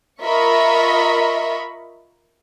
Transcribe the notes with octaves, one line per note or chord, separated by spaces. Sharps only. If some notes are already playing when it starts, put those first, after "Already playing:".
F4 A#4 D#5 E5 B5 C#6